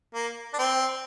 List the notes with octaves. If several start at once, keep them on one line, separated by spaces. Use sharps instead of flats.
A#3
D4
C4